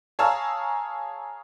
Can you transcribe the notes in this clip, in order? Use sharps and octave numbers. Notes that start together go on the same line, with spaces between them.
G#4 C#5 F5 A5 A#5 E6